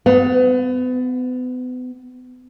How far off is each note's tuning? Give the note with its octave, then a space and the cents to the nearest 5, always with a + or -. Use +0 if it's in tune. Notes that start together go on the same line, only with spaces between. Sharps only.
B3 +35 F#5 -25